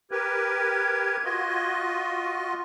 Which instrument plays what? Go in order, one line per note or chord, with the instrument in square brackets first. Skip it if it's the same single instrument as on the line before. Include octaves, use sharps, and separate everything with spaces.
[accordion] G4 A#4 B4 [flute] G#6
[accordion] F4 F#4 D#5
[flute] C6